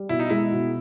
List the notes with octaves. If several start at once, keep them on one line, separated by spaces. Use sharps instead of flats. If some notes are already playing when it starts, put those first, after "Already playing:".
Already playing: G3
B2 E4
D#4
G#3 E4
B2